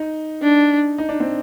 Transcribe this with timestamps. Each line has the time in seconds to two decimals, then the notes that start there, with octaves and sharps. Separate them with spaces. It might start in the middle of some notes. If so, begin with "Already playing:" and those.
Already playing: D#4
0.42 D4
0.98 D#4
1.09 D4
1.20 C4